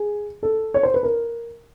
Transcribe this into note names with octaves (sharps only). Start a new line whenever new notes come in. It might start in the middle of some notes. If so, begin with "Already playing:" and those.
Already playing: G#4
A4
C#5
C5
B4
A#4